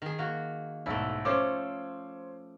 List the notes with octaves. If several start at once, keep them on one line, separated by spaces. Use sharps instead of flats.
D#3 G#4
A#3 F#4
B1 G#2 A3 E4
F3 C#4 A4 C5 C#5 D6